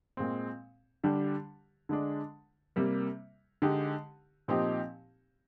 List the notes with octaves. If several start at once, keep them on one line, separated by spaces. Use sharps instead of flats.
A#2 G#3 C4
D3 G3 D4 G4
D3 G#3 D4
C3 G3 A#3
D3 G#3 D#4 G4
A#2 F3 C4 D#4 G4